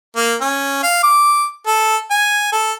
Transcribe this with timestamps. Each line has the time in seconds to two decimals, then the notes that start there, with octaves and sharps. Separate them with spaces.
0.16 A#3
0.41 C#4
0.83 F5
1.03 D6
1.67 A4
2.10 G#5
2.52 A4